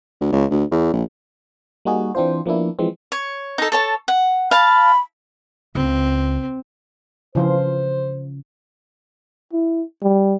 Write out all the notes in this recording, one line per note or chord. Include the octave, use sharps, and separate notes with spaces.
D2
C#2
D2
E2
A#1
G3 A#3 D#4 F#4 G#4
E3 C4 D4 F4 C5
F3 A#3 B3 D4 E4
E3 F3 G#3 C4
C#5
D#4 A4
A4 C#5 A5
F#5
F5 A5 B5
C#2 C4
C#3 E3 F3 F4 C5
E4
G3